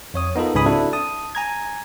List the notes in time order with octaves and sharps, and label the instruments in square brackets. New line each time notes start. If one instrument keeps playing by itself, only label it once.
[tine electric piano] F2 C#5 D#6
B3 D#4 F4 A4 A#4
C#2 G#2 C#3 G#5 B5 D#6
C4 D4 E4 F#4 A4
A5 D#6
G#5 A#5 G#6